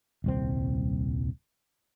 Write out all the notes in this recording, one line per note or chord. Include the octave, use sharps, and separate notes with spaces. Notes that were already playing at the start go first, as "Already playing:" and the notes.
D#1 C2 C4